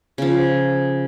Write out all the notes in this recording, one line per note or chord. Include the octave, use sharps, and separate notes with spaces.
C#3 F3